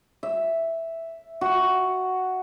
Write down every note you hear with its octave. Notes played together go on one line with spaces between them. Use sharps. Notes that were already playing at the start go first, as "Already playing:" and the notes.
E5
F#4